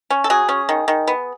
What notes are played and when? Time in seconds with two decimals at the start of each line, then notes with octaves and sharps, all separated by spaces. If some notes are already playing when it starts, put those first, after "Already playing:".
0.10 C#4
0.24 A4
0.30 F#3 G#4
0.49 C#4
0.69 D#3
0.88 D#3
1.07 B3